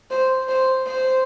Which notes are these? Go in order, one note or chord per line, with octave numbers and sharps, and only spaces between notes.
C5
C5
C5